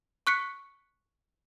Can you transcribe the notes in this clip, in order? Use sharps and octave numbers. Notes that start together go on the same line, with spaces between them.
C#6 F#6 B6 C#7